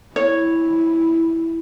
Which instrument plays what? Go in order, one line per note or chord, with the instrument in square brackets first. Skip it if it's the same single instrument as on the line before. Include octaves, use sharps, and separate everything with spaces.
[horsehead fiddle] E4 [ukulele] C#5